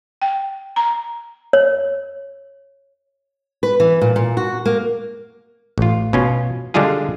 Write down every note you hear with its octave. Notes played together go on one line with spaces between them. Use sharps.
G5
A#5
C#5
B4
E3
A#2
A#2
F#4
A#3
A1 F4
B2 C#4 F4
D3 G3 G#3 D4 F4 G#4